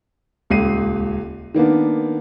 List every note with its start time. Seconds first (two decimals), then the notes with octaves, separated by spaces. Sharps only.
0.50 D#1 C#2 C7 D#7
1.54 D#3 A#3 B3 D4